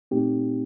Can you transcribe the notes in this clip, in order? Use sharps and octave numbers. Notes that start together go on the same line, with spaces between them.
A#2 A3 C4 D#4 G4